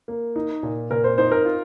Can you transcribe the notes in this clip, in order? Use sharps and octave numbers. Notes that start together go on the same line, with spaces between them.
A#3
D#4
A#2
A#2 A#4
C5
D#4 C5
A#4
F4